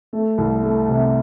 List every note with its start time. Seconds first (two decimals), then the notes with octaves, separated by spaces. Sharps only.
0.13 A3
0.38 C2
0.63 A3
0.88 C3